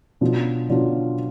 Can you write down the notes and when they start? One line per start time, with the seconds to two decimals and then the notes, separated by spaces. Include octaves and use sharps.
0.21 B2 F#3 D4 F4
0.69 B2 F#3 D4 F4